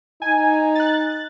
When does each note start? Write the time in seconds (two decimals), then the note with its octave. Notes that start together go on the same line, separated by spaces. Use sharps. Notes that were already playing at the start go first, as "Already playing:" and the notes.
0.22 D#4 G#5
0.75 F#6 A6